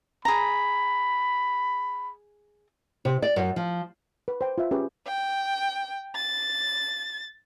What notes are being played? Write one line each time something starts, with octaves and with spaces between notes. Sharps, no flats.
G#4 A#5 B5
C3
D5
F#2
F3
B4
C5 G5
F4 E5
C#4 G4 G#4 B4
G5
A6